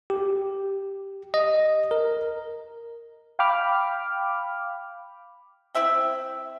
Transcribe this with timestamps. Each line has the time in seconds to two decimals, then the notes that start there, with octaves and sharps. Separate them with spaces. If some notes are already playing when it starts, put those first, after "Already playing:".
0.10 G4
1.34 D#5
1.91 A#4
3.39 F5 G5 B5 D6 F6
5.75 C4 E4 E5 G5